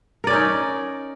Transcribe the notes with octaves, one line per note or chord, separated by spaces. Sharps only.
C#4 D#4 A#4 D5